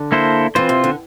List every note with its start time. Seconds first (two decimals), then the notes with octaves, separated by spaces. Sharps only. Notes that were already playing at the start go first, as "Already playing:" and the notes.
Already playing: D3
0.12 A#3 E4 A4 C5
0.55 E3 C4 F4 C5
0.69 C3
0.84 D3